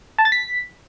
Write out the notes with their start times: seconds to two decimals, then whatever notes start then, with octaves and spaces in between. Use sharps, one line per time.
0.18 A5
0.25 A6
0.32 B6